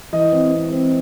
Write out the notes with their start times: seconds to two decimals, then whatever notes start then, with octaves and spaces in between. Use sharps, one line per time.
0.13 E3 D#5
0.32 C4
0.52 C4
0.72 C4